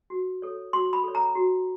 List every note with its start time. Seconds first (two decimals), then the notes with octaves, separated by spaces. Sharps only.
0.10 F#4
0.42 A4 C#5
0.73 F#4 C6
0.93 B5
1.04 A4 C#5
1.15 A#5
1.35 F#4